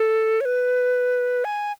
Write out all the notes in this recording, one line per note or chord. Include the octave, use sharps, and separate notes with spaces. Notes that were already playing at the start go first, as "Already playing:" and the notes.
Already playing: A4
C#5
B4
G#5